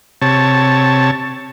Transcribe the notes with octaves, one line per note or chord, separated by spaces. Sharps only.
C3 C#5 A5